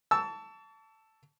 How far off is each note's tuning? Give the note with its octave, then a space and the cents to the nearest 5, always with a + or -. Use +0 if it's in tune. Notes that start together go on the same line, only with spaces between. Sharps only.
A5 +5 C#6 +40 E6 +0